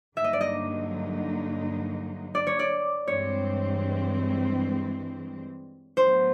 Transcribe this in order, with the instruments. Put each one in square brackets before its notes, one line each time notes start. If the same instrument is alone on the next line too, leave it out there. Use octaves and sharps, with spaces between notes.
[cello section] G2 D3 F#3 A#3 D#4 [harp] E5
[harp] D#5
D5
D#5
D5
C#5
D5
[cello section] G2 E3 G#3 C4 [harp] C#5
[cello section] A2 F#3 B3 [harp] C5